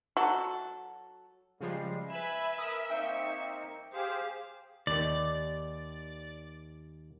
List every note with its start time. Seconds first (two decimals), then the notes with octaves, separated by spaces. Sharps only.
0.17 F#3 F#4 A4
1.61 C#3 F3 G3 G#3 C7
2.10 B4 E5 G#5 B5 E7
2.58 A#4 B5 D#6 E6
2.90 A#3 C4 D#4 G5 C#6
3.93 G4 G#4 C5 F5
4.87 D#2 D#3 D5